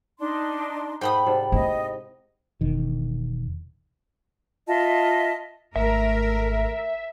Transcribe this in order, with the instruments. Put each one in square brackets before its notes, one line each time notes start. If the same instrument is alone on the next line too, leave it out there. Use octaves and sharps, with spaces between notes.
[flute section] D4 D#4 C6
[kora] G#2 A3 [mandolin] G5 B5 D#6
[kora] G#2 C3 A4 [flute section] D5
[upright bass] C4 [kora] E4 [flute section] D#5
[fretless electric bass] E1 D#3
[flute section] F4 D#5 E5 A5
[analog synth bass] G#1 [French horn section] A3 [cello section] A#4 [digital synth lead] E5